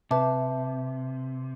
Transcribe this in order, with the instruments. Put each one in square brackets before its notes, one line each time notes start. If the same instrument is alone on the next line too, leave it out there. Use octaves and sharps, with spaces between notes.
[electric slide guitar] C3 [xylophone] B4 E5 A5 D6